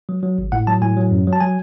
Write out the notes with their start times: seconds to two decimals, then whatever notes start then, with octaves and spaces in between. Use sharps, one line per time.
0.09 F#3
0.23 F#3
0.38 G#1
0.52 A2 F#5
0.67 F#3 A5
0.82 A2 G#5
0.97 F#3
1.11 F#2
1.27 F#3
1.33 A5
1.40 F#3 G#5